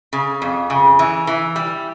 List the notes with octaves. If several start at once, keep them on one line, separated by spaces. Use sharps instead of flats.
C#3
F2
C#3
E3
E3
G3